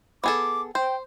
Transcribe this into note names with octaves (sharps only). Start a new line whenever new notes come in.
B3 G#4 A4 D6
C5 G5